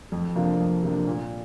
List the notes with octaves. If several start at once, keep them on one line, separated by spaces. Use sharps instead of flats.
F2
C3 F3 A#3 D4
F2
C3 F3 A#3 D4
A#2